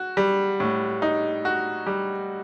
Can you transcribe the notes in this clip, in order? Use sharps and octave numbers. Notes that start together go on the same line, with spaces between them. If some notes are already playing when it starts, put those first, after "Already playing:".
Already playing: F#4
G3
A2
D#4
F#4
G3